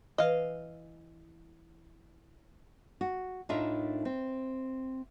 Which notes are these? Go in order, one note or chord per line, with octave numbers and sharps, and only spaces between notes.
E3 D#5 F5
F#4
A2 D4 D#4 F4 A#4 E5
C4